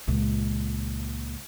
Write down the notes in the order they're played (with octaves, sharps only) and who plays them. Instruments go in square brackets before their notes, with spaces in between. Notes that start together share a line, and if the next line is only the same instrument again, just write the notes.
[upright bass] C#2 A#2